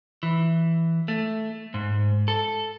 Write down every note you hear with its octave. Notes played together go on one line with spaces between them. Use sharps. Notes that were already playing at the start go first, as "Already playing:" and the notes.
E3
A3
G#2
A4